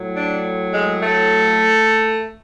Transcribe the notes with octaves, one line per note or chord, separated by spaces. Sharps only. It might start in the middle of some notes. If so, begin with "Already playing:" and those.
Already playing: A2 F#3
D4
G#3
A3